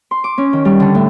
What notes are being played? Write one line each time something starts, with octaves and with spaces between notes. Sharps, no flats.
C6
D6
C#4
D#3
G3
D3
A2